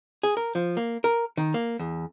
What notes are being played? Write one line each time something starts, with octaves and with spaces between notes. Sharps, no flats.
G#4
A#4
F3
A#3
A#4
D#3
A#3
E2